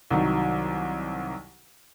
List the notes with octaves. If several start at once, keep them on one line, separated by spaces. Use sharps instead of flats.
C2 D#3 F#3